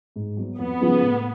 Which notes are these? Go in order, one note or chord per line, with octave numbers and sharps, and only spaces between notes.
G#2
F#3 B3
F2 B3
C#3 F3 G#3 C#4
A2